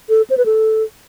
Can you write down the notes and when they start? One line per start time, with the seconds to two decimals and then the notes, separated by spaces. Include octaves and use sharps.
0.09 A4
0.30 C5
0.38 B4
0.46 A4